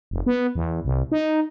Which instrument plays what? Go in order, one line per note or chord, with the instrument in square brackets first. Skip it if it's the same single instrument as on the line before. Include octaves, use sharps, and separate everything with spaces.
[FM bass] F1
B3
E2
C2
D#4